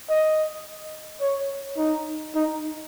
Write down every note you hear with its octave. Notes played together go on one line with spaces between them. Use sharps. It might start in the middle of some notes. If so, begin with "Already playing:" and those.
D#5
C#5
D#4
D#4